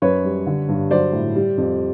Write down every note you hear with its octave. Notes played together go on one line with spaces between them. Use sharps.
F#2 B4 C#5
G3
D3
G2
F#3 C5 D5
A2
G3
F2